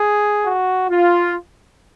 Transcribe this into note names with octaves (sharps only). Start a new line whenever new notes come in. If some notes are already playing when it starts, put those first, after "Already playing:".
Already playing: G#4
F#4
F4